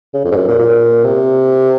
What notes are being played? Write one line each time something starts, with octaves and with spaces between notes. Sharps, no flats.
C#3
F2
G#2
F#2
A#2
A#2
C3